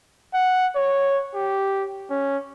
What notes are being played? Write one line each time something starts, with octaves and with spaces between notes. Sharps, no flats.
F#5
C#5
G4
C#4